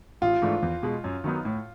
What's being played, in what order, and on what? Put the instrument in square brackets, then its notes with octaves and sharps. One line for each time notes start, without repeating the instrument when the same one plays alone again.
[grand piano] A1 [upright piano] F4
[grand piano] G#2 E3 A3 D4
E2
B2 G#3
F#2
D#3 F#3 B3 D#4
A2